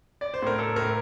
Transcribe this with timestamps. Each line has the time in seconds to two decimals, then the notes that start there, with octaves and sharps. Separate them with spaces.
0.21 D5
0.34 C5
0.42 A2 A#4
0.59 A4
0.76 A2 A#4